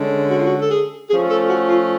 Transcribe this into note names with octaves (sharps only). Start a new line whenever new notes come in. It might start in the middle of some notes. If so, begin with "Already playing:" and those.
Already playing: D3 G#3 C#4
F#4
F4
F#4
A4
G#4
F3 A3 C#4 G#4
A4
F#4
F4